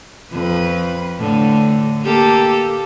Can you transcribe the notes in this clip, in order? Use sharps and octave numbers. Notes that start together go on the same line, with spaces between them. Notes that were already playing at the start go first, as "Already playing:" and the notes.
F2 B4
A2 D3
A#3 G4 A4